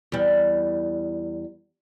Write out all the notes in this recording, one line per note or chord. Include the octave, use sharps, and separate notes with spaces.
E2 G3